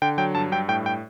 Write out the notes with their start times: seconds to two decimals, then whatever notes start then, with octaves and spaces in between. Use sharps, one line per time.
0.02 D3 G5
0.18 F#3 G5
0.35 G2 A5
0.52 G2 G5
0.68 A2 G5
0.86 G5